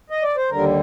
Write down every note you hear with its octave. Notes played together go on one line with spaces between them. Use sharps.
D#5
D5
C5
D#2 D3 G3 A#4